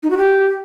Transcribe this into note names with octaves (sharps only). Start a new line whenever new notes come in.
D#4
F#4
G4